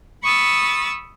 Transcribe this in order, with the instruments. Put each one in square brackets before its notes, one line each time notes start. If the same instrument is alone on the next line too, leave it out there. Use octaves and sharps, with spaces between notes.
[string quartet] B5 C#6 D#6 E6 A6